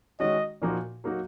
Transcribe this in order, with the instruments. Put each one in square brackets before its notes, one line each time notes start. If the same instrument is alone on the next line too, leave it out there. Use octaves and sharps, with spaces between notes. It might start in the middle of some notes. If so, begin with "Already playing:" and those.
[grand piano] D#3 G#3 C#4 F#4 [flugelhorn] D#5
[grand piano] A#2 F3 A#3 D#4 F#4
F#3 A#3 D#4 F#4